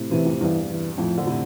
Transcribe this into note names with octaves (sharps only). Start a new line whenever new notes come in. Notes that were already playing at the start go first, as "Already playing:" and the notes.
Already playing: A2 C3
A2 C3 E3
F2 A2
E2 G2 E3
E3
F2 A2 F3
D3
A2 C3